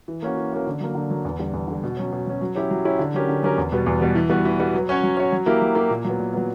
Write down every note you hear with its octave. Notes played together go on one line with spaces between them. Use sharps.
E3
A#3 C#4 F#4
E3
A#3 C#4 F#4
D3
F#3 A#3
D3
F#3 A#3
E2
D3 G3
E2
D3 G3
B2
F#3 C#4
B2
F#3 C#4
F#3
C#4 E4 G4 C#5
F#3
C#4 E4 G4 C#5
D3
F#3 C#4 G4 A#4
D3
F#3 C#4 G4 A#4
E2
B2 G3 B3
E2
B2 G3 B3
E3
G3 B3 F#4 B4
E3
G3 B3 F#4 B4
F#3
C#4 F#4 C#5
F#3
C#4 F#4 C#5
F#3
A#3 E4 G4 A#4
F#3
A#3 E4 G4 A#4
A#2
F#3 B3
A#2
F#3 B3